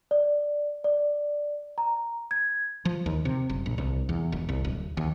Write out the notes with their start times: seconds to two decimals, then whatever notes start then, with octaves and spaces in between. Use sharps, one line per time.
0.11 D5
0.84 D5
1.78 A#5
2.31 G#6
2.85 F3
3.06 D#2
3.25 C3
3.50 F#1
3.66 A#1
3.78 C2
4.09 E2
4.32 E1
4.49 C2
4.65 D1
4.97 D#2